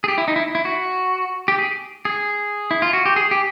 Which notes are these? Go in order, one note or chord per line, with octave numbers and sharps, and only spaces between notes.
G#4
G4
E4
D#4
E4
E4
F#4
G4
G#4
G#4
E4
F4
F#4
G4
G#4
G4